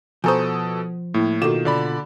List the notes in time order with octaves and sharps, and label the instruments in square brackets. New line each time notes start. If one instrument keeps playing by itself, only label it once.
[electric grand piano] B2 A4 D#6 [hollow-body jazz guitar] F3 C5 [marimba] G#5 A#5 C#6
[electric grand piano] A2 [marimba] A#3 E4
[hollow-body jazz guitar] B2 F4 [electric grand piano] D#3 E7 [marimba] F#4 A4 D6
[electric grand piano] D3 D5 B5